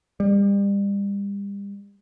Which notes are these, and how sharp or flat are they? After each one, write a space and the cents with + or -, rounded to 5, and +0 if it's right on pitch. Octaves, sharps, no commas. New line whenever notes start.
G3 +35